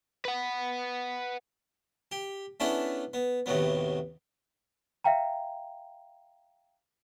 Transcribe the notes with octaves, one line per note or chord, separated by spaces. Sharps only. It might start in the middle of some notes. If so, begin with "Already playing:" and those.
B4 F#5
G4
A3 B3 C#4 D4 E4 G#4
B3
D#2 A2 C3 F#3 B3
E5 F5 G5 A#5